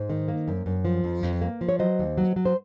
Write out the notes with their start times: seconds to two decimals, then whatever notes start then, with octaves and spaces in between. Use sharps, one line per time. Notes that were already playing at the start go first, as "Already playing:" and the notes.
Already playing: G#2 C5
0.09 D#3
0.28 A#3
0.48 F#2
0.66 F#2
0.85 F3
1.04 F2
1.23 F2
1.42 A#3
1.61 F3
1.69 C#5
1.79 F#3 C5 D#5
1.99 D#2
2.17 F#3
2.36 F#3
2.45 C5